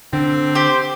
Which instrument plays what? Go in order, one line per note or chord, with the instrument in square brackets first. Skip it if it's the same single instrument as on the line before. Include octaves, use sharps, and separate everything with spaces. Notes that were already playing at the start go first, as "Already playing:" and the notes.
[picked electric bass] D3 [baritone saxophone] C4
[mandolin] G4 [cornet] C5